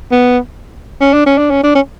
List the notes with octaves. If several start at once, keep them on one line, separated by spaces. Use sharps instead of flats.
B3
C#4
D4
C#4
D4
C#4
D4
C#4